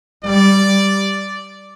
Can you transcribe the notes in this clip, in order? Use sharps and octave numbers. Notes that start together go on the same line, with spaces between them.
G3 D5